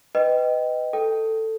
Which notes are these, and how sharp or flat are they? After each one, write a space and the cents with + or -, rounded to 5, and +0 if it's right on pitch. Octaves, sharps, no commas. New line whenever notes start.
B4 +20 D#5 +0 G5 -15
A4 +10 G5 +0